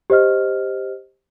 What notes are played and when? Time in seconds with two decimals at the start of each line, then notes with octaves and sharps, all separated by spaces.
0.10 G4 C5 D#5 F6